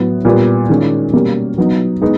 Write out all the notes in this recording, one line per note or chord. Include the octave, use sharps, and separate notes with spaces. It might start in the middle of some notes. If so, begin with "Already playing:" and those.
Already playing: A2 F#3 B3
A#2 G3 B3
D#3 G#3 C#4 F4
B2 G3 A#3 C#4
F#3 B3 D#4
G#3 B3 D#4